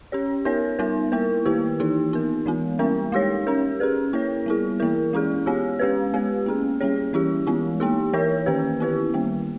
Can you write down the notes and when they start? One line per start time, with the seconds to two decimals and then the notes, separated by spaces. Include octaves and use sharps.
0.12 C#4 G4 C#5
0.45 B3 D#4 A#4 C#5
0.79 G3 B3 D#4 A#4
1.12 A#3 E4 A#4
1.45 D#3 A#3 E4 G4 B4
1.80 E3 A#3 D#4 G4
2.13 B3 D#4 A#4
2.46 E3 G#3 B3
2.79 G3 A#3 C#4 E4 A#4
3.12 G#3 D#4 G4 C#5
3.47 C#4 G4 A#4
3.80 C#4 G#4 B4
4.13 A#3 E4 A#4 C#5
4.46 G3 B3 E4 G#4
4.80 E3 A#3 E4 A#4
5.13 G#3 C#4 E4 G#4
5.46 G#3 B3 G4 C#5
5.79 G#3 C#4 G4 B4
6.14 G#3 B3 G4 B4
6.46 A#3 C#4 G#4
6.80 G3 A#3 C#4 G#4 C#5
7.13 E3 G3 C#4 E4 G4
7.47 E3 G#3 B3 E4
7.80 A#3 D#4 G4
8.13 E3 A#3 E4 A#4 C#5
8.46 D#3 A#3 C#4 G4 B4
8.80 B3 E4 G4 B4
9.14 D#3 G3 A#3